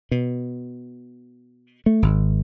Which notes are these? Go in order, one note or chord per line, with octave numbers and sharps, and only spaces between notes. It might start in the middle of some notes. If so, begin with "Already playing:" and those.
B2
A3
G#1